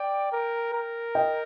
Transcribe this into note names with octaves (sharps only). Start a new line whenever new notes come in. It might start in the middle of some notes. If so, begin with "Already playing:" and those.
Already playing: D5 G5
A#4
A#4
D#5 G5